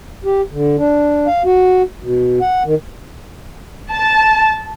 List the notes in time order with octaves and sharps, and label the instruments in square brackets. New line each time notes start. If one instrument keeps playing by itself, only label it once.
[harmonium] G4
D3
D4
F5
F#4
B2
F#5
D#3
[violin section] A5